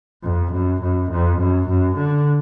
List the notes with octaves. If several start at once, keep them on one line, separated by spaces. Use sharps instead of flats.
F2
F#2
F#2
F2
F#2
F#2
D3